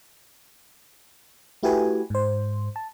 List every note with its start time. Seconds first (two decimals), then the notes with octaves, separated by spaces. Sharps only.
1.63 A3 E4 F#4 G4 B4 G#5
2.10 G#2 C5
2.76 A5